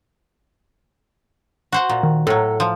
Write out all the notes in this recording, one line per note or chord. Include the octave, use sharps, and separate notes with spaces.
F#4 C5 F#5
A#2
D#3
A2 F#3 A4
F3